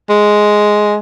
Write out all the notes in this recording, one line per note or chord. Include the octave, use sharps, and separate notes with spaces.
G#3